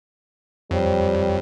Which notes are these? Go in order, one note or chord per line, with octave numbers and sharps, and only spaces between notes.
F2 G3 C5 C#5 G5